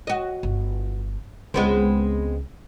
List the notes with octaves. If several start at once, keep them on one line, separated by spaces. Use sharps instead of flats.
F#4 D#5
G1
C#2 G#3 B3 C4